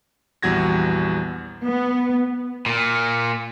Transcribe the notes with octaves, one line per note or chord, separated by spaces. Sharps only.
A#1 E2 G3 F#4 G#6 A#6
B3
A#2